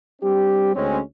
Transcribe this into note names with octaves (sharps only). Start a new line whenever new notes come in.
G3 C4 D4 G4
D2 G#3 C4 C#4